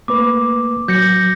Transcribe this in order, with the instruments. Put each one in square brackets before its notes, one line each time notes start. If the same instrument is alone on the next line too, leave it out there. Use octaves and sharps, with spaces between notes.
[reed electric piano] A3 A#3 B4 [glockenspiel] D6
[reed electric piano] F#3 [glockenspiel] G6 A#6 C#7